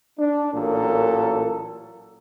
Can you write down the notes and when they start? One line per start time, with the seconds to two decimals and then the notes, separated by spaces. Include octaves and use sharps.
0.18 D4
0.54 A1 A#2 F#3 A4 A#4